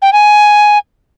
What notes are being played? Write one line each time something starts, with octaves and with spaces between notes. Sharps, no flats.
G5
G#5